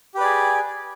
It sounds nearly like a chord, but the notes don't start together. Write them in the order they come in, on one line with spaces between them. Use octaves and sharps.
G4 B4 D5 G#4